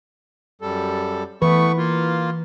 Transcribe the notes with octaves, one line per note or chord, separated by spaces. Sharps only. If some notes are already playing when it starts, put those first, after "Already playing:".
F#2 G3 A4
E3 A3 B3 B4 C#6
A#3 F4